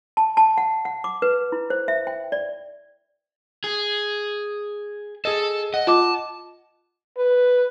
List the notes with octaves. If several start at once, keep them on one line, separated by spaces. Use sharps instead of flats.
A5
A5
F#5
F#5
D6
B4
E4
C5
E5
G5
D5
G#4
G#4 A4 D#5
D#5 F#5
F4 D#5 A5 D6
B4